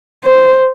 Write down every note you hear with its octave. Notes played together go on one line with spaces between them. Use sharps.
C5